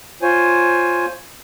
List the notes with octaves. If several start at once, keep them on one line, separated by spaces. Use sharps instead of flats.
F4 C5 C#5 G#5